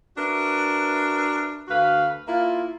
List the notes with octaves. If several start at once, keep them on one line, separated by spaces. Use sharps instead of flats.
D4 F#4 A#4 B4 E5
D2 F#4 B4 F5
A#3 E4 F4